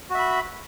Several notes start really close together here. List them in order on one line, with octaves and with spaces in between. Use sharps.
F#4 E5 B5